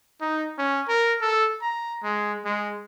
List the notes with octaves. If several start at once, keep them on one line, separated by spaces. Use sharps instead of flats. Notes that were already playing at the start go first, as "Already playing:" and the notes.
D#4
C#4
A#4
A4
A#5
G#3
G#3